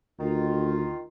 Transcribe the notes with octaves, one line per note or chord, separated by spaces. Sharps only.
D2 D#3 F4